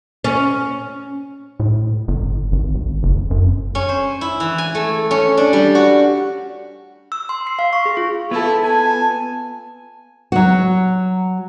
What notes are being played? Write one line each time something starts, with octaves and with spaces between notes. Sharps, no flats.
C#4
A2
G1
G#1
G#1
F#1
F#2
C#4
C5
E4
E3
G#5
A3
C#4
D4
G3
F#4
E6
C6
C7
F5
C#6
G#4
F4
B3 E4 F4 A4
G#5 A5
F#3 F#4